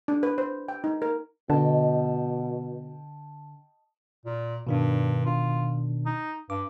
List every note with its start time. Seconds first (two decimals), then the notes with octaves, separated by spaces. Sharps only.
0.08 D4
0.23 B4
0.38 C5
0.68 G5
0.84 D#4
1.02 A#4
1.50 B2 D3 D#5 G5 A5
4.26 A#2
4.67 G2 B2 D#3 D4
5.26 F4
6.06 D#4
6.50 G2 D6